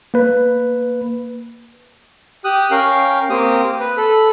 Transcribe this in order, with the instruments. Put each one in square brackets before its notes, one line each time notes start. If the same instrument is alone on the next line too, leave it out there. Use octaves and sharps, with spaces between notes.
[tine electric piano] A#3 B4
[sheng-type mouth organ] G4 D#6 F#6
C#4 A#4 F5 G5
A#3 C4 G4 D#6
B4
A4 B5